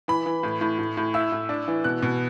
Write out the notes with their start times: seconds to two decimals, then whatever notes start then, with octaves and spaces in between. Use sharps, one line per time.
0.08 E3 B5
0.26 E3
0.43 A2
0.61 A2
0.79 A2
0.97 A2
1.14 E4 E6
1.32 A2
1.49 D4
1.68 E3
1.84 B2 F#6
2.02 B2